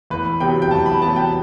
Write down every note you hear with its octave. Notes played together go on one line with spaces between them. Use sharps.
E2 B4
C3 F#3 B3 G5
G5
E2 A5
B5
C3 F#3 B3 A5
G5